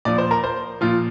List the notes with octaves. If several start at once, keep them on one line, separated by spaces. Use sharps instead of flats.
A#2 F3 D5
C5
A#4
C5
A#2 F3 F4